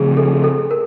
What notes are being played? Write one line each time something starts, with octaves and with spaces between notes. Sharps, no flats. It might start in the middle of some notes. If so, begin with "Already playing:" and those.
Already playing: C#3 F3 A3 C4 G#4
A4
A4
A#4